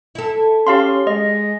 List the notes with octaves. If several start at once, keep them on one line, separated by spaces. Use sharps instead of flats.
E4 A4
C#4 G4 F5 C6
G#3 D#5